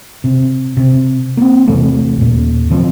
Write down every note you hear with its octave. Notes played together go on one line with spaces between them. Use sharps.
C3
C3
A#3 C4
E2 C3 E3 A3
D#2 A#2
C3 E3 F3 C4